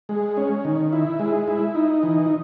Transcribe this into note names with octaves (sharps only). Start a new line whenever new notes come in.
G#3
C#4
D#3
E4
G#3
E4
D#4
E3